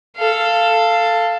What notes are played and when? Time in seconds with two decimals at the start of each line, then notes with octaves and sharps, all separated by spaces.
0.17 A4 F5